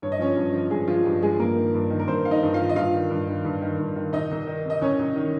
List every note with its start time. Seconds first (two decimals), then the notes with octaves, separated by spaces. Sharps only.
0.02 G2 C#5
0.12 D#5
0.19 F3 C#4 C#5
0.37 G2
0.54 F3
0.71 G2 G#3 G#4
0.87 F3 F4
1.05 G2 G4
1.22 F3 G#3 G#4
1.39 G2 A#3 A#4
1.56 D#3
1.74 G2
1.90 D#3
1.99 A#4
2.08 G2 C4 C5
2.25 D#3 F5
2.31 D#4 D#5
2.43 G2
2.53 F4 F5
2.59 D#3
2.69 D#5
2.76 G2 F4 F5
2.94 D#3
3.11 G2
3.28 D#3
3.45 G2
3.62 D#3
3.79 G2
3.96 D#3
4.13 C2 D#4 D#5
4.31 C2
4.47 D#3
4.65 C3 D#5
4.81 C2 C#4 C#5
4.99 C2
5.16 D#3